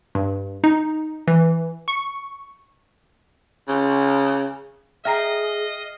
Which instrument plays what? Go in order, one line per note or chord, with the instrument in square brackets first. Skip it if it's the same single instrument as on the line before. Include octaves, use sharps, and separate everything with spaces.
[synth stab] G2
D#4
E3
C#6
[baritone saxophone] C#3
[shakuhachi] G#4 [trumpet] D#5 [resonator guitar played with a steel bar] E5 G5 A#5 [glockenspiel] F6 A#6 C7